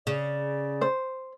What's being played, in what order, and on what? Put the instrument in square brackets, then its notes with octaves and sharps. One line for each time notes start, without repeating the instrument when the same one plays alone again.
[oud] C#3 [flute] D5
[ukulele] C5